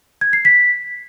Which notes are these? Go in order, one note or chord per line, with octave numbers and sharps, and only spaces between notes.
G#6
C7
B6